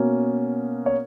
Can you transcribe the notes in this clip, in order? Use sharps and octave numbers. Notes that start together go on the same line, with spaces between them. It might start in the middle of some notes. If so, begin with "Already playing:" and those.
Already playing: B2 A#3 C#4 A#4
C#5